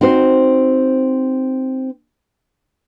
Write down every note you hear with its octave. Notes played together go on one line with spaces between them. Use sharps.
C4 D#4 F#4 C5